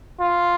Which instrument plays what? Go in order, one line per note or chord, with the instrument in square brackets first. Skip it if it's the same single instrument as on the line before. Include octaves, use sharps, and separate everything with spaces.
[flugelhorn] F4